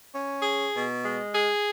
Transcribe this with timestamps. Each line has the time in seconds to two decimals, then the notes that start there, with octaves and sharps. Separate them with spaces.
0.12 C#4
0.42 G#4
0.74 B2
1.04 G#3
1.35 G#4